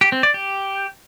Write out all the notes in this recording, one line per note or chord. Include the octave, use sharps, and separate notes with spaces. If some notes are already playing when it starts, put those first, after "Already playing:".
G4
C4
D5
G4